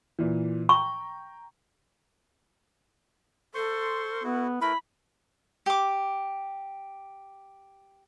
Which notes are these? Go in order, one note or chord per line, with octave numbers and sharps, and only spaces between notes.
A#2 E3
G5 A#5 C#6
A4 C5 C6 C#6
B3 E4 F#4
A3 E4 A#4 B4 B5
G4 D6